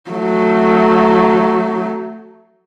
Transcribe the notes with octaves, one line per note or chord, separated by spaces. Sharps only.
F#3 A3